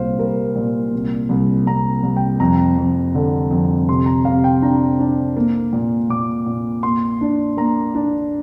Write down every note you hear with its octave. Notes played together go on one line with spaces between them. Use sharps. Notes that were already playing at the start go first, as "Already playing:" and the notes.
Already playing: C2 A#2 C5 F5
G3 A#4
A#2
C2
C2
C2 A#5
C2
G5
F2 A#5
F2
D3
F2
C3 C6
A#5
C3 F5
G5
D4 A#5
D4
A#3
A#2
A#2 D6
A#2
A#3 C6
D4
A#3 A#5
D4